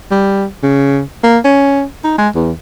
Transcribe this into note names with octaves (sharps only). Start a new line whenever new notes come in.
G3
C#3
A#3
C#4
D#4
G#3
E2